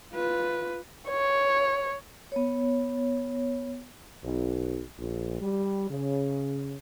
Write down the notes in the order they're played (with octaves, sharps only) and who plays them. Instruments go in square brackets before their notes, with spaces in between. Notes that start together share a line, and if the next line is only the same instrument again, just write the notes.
[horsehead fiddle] F4 B4
[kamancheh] C#5
[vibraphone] B3 C#5
[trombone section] B1
A#1
G3
C#3